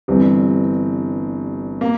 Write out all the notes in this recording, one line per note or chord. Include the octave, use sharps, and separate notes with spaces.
G1 G2 E3 C4
A#3